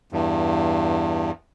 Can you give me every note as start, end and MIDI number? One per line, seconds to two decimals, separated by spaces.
0.12 1.31 40
0.12 1.31 43